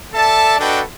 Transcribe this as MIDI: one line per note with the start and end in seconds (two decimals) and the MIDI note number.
0.14 0.56 69
0.14 0.56 74
0.14 0.56 76
0.14 0.56 81
0.59 0.81 62
0.59 0.81 66
0.59 0.81 69
0.59 0.81 71
0.59 0.81 75
0.59 0.81 79